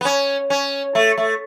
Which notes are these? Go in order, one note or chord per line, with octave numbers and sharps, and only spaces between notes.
B3
C#4
C#4
A3
A3